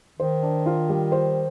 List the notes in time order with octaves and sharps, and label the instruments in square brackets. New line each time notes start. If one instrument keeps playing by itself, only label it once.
[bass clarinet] D#3 [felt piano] C5
[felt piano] D4
F4
G3
C5